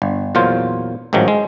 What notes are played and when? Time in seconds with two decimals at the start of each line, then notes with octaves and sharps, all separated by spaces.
0.02 G1
0.35 E2 A#2 F#3 F4 C5
1.13 A1 G#2 D#3 F3 F#3
1.28 G#3